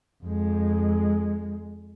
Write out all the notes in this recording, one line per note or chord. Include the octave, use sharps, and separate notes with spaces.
F2 G#3